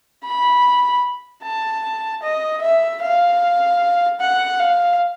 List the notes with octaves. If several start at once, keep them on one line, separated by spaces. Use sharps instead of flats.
B5
A5
D#5
E5
F5
F#5
F5